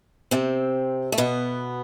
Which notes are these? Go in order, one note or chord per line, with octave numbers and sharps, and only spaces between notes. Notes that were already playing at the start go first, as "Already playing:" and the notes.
C3 C4
A3
B2 B3